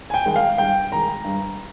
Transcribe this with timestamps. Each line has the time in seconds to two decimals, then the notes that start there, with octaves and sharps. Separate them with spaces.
0.10 G#5
0.14 G5
0.26 D#3 G#3 G5
0.36 F5
0.58 G2 G5
0.92 D#3 G#3 A#5
1.24 G2